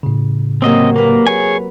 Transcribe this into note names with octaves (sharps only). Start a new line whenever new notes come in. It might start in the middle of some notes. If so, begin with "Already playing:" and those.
A2 C#3
C3 F#3 A#3 C4 D#5
A#3 A#4 B4
G#4 C#5 G#5